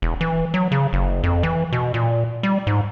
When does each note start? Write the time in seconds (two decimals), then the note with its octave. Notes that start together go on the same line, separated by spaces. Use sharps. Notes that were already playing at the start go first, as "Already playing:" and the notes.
0.02 E1
0.21 E3
0.54 F#3
0.72 C#3
0.93 F#1
1.23 F2
1.43 E3
1.73 B2
1.94 A#2
2.43 G3
2.67 G#2